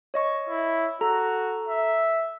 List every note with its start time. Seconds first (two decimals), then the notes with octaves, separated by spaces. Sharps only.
0.14 C#5 D#5 C#6
0.49 E4
1.01 F#4 A4 A#5
1.68 E5